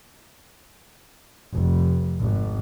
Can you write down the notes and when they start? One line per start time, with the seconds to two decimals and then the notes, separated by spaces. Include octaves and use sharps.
1.53 F1
2.21 G#1